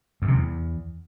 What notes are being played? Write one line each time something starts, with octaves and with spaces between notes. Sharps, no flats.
F#2
C3
E2